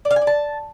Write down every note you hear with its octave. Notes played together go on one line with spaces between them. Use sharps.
D5
F5
G#5
D5
A5